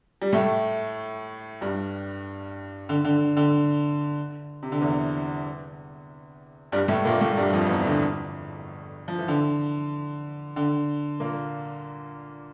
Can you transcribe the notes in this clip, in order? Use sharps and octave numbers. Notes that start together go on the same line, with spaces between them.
G3
A2 A3
G2 G3
D3
D3
D3
C3
D3
E2 E3
G2 G3
A2 A3
A#2 A#3
A2 A3
G2 G3
F2 F3
E2 E3
D3
F3
E3
D3
D3
A#2 A#3